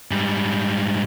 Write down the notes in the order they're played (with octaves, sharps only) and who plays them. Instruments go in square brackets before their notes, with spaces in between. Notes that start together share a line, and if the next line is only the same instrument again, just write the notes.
[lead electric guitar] G#2 G3